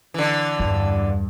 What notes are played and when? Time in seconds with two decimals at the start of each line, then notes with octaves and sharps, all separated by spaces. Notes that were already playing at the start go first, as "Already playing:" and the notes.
0.14 D3 E3
0.60 E2 G2